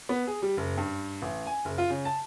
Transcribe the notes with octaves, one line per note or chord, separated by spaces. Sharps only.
B3
G#4
G3
F#1
G2
A1
G#5
F#1
F4
C#3
A5